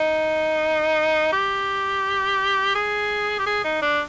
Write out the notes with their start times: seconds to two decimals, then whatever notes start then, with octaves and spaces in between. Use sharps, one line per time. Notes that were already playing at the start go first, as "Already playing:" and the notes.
Already playing: D#4
1.33 G4
2.75 G#4
3.39 G4
3.46 G#4
3.64 D#4
3.82 D4